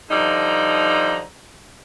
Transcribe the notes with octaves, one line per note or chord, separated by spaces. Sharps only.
D3 F3 G3 D#4 A#5